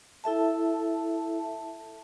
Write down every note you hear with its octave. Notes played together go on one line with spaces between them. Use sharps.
E4 A4 E5 A5